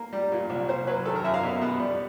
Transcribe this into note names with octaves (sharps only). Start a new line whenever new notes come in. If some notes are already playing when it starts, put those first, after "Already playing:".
Already playing: A#3
G3
A#2
C2
A#3 C5
F#3 B4
D#3 A4
A#4
F#2 E5
F5
B2
B3
G3